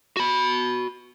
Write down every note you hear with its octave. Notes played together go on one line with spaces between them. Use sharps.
F#4 B5